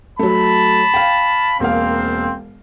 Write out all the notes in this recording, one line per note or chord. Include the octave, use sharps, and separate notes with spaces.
F#3 A3 A5 B5
F5 G5
E1 A#3 C4 F5